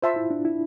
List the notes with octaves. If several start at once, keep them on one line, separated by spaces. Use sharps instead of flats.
F4 C5 E5 A5 C6
E4
D4
E4